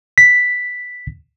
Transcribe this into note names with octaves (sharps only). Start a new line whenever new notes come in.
B6